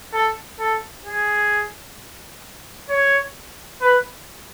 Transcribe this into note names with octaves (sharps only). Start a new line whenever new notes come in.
A4
A4
G#4
C#5
B4